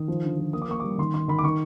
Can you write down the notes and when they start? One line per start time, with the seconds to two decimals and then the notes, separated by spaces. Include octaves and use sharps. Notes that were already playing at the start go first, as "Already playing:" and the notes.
Already playing: D#3 D#6
0.08 F3
0.24 D3
0.39 F3
0.53 A#3 D#6
0.62 D6
0.69 A#3 C#6
0.80 G3 D6
0.98 D#3 C6
1.14 D#3 C6
1.28 D#3 B5
1.39 D6
1.43 D#3 C#6